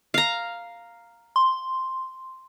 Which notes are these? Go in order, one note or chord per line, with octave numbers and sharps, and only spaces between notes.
F5 A#5
C6